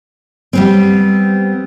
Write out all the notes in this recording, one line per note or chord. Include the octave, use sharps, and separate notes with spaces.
G3 B3 C4